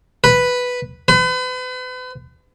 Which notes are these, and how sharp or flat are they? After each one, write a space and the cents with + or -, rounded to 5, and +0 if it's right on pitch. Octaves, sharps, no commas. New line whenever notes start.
B4 +0
B4 +40